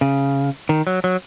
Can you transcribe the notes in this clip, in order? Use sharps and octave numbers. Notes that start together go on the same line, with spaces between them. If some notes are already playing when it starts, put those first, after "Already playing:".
C#3
D#3
F#3
F#3